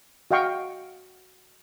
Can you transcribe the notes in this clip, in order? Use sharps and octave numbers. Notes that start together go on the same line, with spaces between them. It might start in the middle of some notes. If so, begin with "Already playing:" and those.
F#4 D#5 F5 G5 C#6